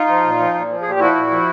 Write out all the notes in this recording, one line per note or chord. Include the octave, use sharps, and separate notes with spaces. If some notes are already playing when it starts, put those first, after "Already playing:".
Already playing: D#4 F4
F3
A#2
F3
A#2
F3
A#2 G#4
G4
F3 E4 F#4
A#2
F3